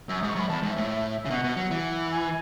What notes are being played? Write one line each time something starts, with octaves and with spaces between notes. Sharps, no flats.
F#2 E6
G#2 D#6
C#6
F#2 B5
E2 A5
G#2
E5
A2
E5
E5
C#3 E5
B2 F#5
B2
F#3
E3
G#5